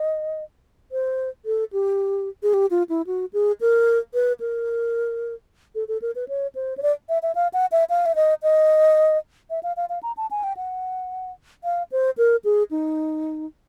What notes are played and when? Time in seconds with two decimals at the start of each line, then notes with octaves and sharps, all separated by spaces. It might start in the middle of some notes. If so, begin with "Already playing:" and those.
Already playing: D#5
0.92 C5
1.45 A4
1.73 G4
2.43 G#4
2.54 G4
2.71 F4
2.89 E4
3.07 F#4
3.33 G#4
3.61 A#4
4.14 B4
4.40 A#4
5.75 A4
5.88 A4
6.02 A#4
6.15 B4
6.28 C#5
6.55 C5
6.77 C#5
6.82 D5
7.09 E5
7.23 E5
7.35 F5
7.53 F#5
7.72 E5
7.90 F5
8.06 E5
8.15 D#5
8.43 D#5
9.50 E5
9.63 F5
9.77 F5
9.89 F5
10.03 A#5
10.17 A5
10.31 G#5
10.44 G5
10.57 F#5
11.64 F5
11.92 C5
12.18 A#4
12.45 G#4
12.71 D#4